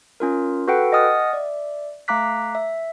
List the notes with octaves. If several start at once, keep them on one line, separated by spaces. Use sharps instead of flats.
C#4 F4 A#4
F#4 A4 B4 F#5 G5
D#5 F#5 G#5 D#6 F6 A6
D5 E5
A3 F5 A#5 D6 F#6 B6
E5